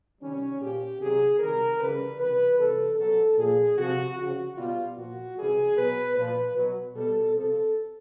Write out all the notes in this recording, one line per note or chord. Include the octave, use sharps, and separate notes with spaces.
C3 D#3 G3 C#4
A#2 F3 G4
C3 D#3 F#3 G#4
C3 D#3 G3 A#4
C#3 E3 G3 B4
C3 E3 G3 B4
C3 E3 G3 A4
B2 F#3 A4
A#2 F3 G#4
C3 F3 F#4
C#3 F3 F#4
B2 G3 F4
A#2 F3 F#4
C3 E3 G3 G#4
B2 F#3 B4
A#2 F3 B4
B2 F#3
B2 G3 A4
C3 F3 A4